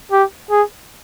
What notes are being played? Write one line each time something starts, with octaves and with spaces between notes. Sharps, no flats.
G4
G#4